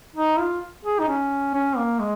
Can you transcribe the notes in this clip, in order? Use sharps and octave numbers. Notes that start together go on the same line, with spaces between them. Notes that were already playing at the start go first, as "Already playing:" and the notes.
D#4
F4
G#4
D#4
C#4
C#4
A#3
G#3